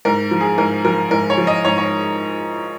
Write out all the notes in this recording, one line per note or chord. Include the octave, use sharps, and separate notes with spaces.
G#2 A#4
F3
G#4
G#2 A#4
F3 A#4
G#2 A#4
C#5
F3
D#5
G#2 C#5
C#5